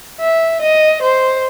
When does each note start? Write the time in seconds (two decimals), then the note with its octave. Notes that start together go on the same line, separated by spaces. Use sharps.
0.20 E5
0.61 D#5
1.02 C5